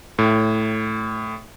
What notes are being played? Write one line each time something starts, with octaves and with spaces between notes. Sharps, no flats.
A2